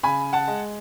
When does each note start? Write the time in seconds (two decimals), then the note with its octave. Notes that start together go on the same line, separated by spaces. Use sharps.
0.03 C#3 G#5 B5
0.33 F#5 A5
0.48 G#3